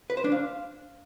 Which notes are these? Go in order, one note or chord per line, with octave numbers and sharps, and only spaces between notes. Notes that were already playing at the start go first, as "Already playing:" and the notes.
B4
C5
D4
F5